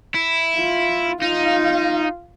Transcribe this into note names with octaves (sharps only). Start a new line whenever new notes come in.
E4
F4
D#4 F4 F5